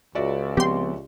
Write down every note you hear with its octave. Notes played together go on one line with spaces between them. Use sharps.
C#2 F#4 D5 E5
F3 B3 C4 G4 C6